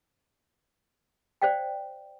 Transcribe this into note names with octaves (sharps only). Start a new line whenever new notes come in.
C5 D5 F5 G5